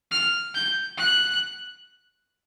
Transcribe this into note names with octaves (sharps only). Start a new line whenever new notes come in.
F6
G6
F#6